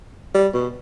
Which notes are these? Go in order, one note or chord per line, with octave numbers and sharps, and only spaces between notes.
G3
B2